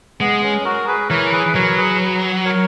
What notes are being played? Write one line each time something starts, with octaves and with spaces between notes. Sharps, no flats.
G#3 B3
C#4
F#4 A#4
G#4 B4
E3 A#4 C#5
G#4 B4
F#3 A#4 C#5
G#4 B4
A#4 C#5